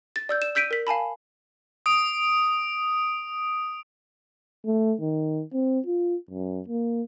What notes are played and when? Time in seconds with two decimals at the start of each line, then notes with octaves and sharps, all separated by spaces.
0.16 A6
0.29 D5 E6 G6
0.42 E7
0.55 E6 G6 B6 D7 D#7
0.71 A#4 B6
0.87 F5 G#5 A5 B5
1.86 D#6 D7
4.66 A3
5.01 D#3
5.53 C4
5.86 F4
6.30 F#2
6.68 A#3